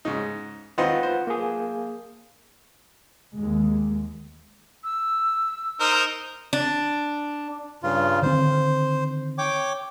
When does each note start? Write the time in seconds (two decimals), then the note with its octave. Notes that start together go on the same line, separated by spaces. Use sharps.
0.05 G#2 C#3 D#4
0.78 D#3 C4 F4 B4 D#5 F#5
1.03 C5
1.27 A#3 G#4
3.37 D#2 G#3
4.84 E6
5.80 D#4 A#4 C5
6.53 D4
7.83 G2 C#3 F4
8.22 D3 D#3 C4 C5
9.38 C#5 G5 D6